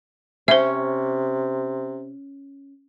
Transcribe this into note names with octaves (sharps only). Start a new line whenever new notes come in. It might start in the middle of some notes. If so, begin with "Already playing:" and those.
C3 C#4 C5 E5